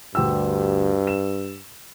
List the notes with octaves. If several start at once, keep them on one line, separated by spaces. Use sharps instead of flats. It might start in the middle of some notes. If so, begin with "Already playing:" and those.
D2 G2 G4 E6
E7